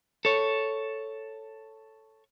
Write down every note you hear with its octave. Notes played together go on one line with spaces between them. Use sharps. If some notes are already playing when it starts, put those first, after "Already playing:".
A4 C#5